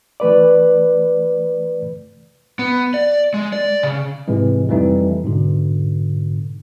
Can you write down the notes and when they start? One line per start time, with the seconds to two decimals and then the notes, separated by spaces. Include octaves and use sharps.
0.20 E3 A3 B4 D5
2.59 B3
2.94 D5
3.34 G#3
3.53 D5
3.83 C#3
4.28 G#2 C3 E3 G#3
4.69 F2 E3 G3 A3 D#4
5.24 G#2 B2 D3